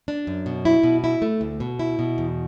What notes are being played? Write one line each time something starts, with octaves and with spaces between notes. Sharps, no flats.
D4
F#2
B2
E4
B2
E4
A3
D2
B2
E4
B2
E2